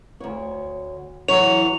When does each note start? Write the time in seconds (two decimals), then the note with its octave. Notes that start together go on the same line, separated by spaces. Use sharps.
0.20 D2 C#5
1.28 E3 F#3 C#5 F7